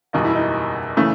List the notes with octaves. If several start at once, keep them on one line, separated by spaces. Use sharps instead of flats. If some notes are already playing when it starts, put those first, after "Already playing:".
F#1 E2 B2 G3 D#4
E4
D#4
C#3 E3 A3